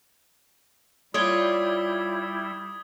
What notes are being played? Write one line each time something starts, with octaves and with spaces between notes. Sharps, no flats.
G3 E4 F4 C#5 D5 D#6 G#6 G7